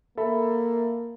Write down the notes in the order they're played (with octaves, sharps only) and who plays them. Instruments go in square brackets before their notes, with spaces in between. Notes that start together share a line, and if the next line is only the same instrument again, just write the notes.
[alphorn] A#3 [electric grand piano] A4 E5 B5